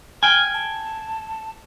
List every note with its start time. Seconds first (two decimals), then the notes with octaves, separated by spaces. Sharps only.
0.23 G5 G#5 F6
0.54 A5